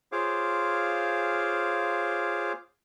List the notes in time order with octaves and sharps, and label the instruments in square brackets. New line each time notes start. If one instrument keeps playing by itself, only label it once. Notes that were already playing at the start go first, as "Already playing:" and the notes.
[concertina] F4 G#4 C5 C#5 F5 D6